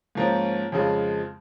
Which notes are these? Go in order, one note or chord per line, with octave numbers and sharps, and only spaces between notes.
G#2 F3 A#3 C#4
F2 C#3 F3 G#3